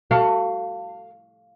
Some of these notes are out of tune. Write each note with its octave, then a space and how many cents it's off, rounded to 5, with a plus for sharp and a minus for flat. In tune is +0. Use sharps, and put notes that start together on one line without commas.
F#4 +25 A4 +30 F5 +0